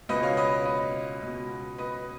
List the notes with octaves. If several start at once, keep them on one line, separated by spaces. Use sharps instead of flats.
C#2 B2 B4 D#5
C#5 F5
B4 D#5
B4 D#5
C#2 B2
B4 D#5